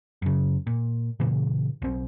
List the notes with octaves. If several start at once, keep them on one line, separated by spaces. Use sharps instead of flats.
F#2 C#3
A#2
A#2 C#3 E3
B1 C4